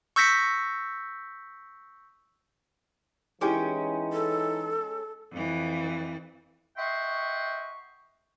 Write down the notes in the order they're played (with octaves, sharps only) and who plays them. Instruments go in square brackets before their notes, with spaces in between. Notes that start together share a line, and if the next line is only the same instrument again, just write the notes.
[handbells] C#6 E6 G6 A#6 B6 C#7
[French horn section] E3 D#4 [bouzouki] G#3 C#4 G5 [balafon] E4 G4 D6
[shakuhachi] A4
[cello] F2 E3
[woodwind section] D#5 E5 F#5 G5 C6 C#6